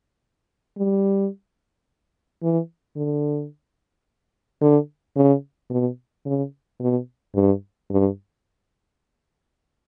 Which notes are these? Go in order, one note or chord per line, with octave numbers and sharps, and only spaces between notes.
G3
E3
D3
D3
C#3
B2
C#3
B2
G2
G2